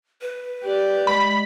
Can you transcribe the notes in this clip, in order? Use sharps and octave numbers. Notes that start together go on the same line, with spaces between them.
B4
G4 D5
G#3 B5